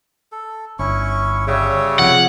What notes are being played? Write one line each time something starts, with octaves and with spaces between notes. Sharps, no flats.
A4
G1 C#4 E4 C#6
C#3 G3 C#5 E5
C3 F3 F#5